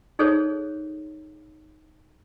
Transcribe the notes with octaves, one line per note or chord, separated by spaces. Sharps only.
D#4 G#4 A4 C5 C#5